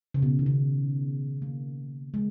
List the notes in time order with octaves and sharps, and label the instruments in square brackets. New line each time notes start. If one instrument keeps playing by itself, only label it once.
[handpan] C#3
B2
D#3
C#3
A#3
G#3